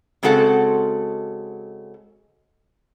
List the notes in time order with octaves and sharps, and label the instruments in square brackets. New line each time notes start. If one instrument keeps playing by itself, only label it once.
[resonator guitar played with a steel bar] C#3 G#3 C4 F#4 A4 F#5